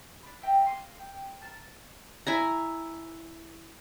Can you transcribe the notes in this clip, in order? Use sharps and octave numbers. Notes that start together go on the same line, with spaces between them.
D4 B5
E5 G5 A#5
A#3 D#4 D#5 C6
G5
A#4 A5
E4 G#5 A#5